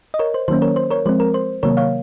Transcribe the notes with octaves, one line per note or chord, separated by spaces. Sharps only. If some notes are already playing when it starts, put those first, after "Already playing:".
D#5
A#4 C#5
C5
D#3 F#3 A#3 C#4 C5
A#4 C#5
C5
A#4 C#5
F3 G#3 C4 C5
A#4
C5
C3 D#3 F#3 A#3 A#4 C#5
C#5 F5